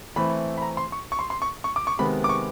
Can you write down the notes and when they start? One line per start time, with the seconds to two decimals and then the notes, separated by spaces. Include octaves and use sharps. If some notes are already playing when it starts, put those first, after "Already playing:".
0.16 E3 A3 C4 B5
0.58 B5
0.62 A#5
0.77 C6
0.92 C#6
1.12 C#6
1.19 C6
1.30 C6
1.42 C#6
1.64 C#6
1.76 D6
1.87 C#6
1.99 C3 D#3 G#3 B3 B5
2.24 D6
2.29 C#6